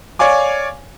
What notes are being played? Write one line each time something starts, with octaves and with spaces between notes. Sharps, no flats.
C#5 D5 F5 G#5 D6